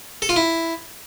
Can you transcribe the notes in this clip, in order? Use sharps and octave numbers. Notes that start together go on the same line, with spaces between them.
A4
F4
E4